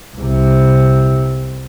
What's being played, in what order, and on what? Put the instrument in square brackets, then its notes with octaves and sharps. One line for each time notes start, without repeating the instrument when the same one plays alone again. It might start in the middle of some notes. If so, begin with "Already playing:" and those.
[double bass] C2 C3